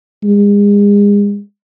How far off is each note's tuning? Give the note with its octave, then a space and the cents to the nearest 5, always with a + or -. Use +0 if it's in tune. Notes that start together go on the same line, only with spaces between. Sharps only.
G#3 -35